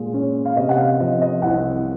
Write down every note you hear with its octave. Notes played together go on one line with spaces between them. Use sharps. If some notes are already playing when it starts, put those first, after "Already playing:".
Already playing: A#2 G#3
C#4
F5
C3 D#5
F#5
F5
F3 D#5
D#5
C2 F#5